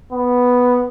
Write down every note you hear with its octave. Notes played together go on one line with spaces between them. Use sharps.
B3